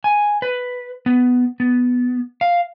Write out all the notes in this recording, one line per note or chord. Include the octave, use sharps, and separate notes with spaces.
G#5
B4
B3
B3
F5